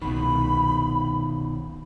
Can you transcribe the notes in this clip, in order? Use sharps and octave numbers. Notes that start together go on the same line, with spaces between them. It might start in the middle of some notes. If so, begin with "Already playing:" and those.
C2 B2 D#3 B5